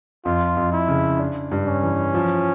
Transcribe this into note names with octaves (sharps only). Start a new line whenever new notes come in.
F2 F4
F2
E4
C#3
D4
G2
C#4
E3
F3